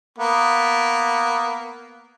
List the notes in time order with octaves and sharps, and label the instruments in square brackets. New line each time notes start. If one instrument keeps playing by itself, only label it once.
[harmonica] A#3 B3